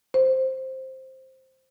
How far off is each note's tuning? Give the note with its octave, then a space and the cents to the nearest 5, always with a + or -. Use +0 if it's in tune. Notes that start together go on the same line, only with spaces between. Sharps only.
C5 +5